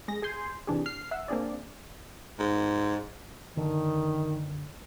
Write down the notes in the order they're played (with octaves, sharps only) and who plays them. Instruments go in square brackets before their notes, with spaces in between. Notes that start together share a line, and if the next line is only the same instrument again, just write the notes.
[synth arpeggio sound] G#3 G#4 A#6
G#4 G#5 C6 G6
C3 E3 D4 G4 G#4
F6 C7
E5 F#5 E6
A#3 C4 D4 G#4 D5
[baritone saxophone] G#2
[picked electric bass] F#1 D3 [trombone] D#3